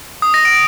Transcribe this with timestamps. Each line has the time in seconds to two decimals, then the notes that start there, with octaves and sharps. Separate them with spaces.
0.22 D#6
0.34 A#6
0.45 D7